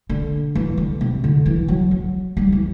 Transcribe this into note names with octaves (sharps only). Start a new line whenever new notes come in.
D3
E3
D3
C3
D3
E3
F#3
F#3
G3
E3